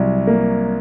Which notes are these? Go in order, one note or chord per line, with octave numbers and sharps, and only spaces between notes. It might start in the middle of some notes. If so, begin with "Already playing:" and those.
Already playing: C2 F#3
A#3